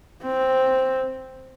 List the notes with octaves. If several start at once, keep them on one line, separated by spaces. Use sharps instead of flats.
C4